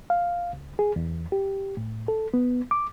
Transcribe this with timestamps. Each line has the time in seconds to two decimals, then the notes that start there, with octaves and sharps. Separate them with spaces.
0.10 F5
0.53 C#2
0.79 G#4
0.96 E2
1.32 G4
1.77 A2
2.08 A4
2.34 B3
2.71 D6